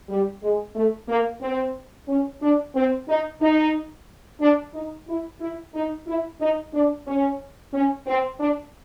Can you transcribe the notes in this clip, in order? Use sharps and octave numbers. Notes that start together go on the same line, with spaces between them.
G3
G#3
A3
A#3
C4
C#4
D4
C4
D#4
D#4
D4
D#4
E4
E4
D#4
E4
D#4
D4
C#4
C#4
C4
D4